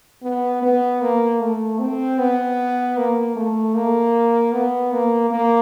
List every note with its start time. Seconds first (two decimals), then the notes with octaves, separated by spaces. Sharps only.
0.23 B3
0.62 B3
1.02 A#3
1.40 A3
1.80 C4
2.19 B3
2.97 A#3
3.36 A3
3.75 A#3
4.52 B3
4.92 A#3
5.31 A#3